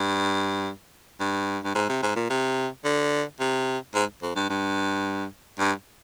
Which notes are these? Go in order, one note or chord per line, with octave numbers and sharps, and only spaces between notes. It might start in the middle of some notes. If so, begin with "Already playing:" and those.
Already playing: G2
G2
G2
G#2
C3
G#2
A#2
C3
D3
C3
G#2
F2
G2
G2
G2